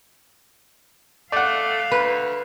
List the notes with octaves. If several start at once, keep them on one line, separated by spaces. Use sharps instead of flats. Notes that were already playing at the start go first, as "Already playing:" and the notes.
A3 D5 F5 F#5
D2 B4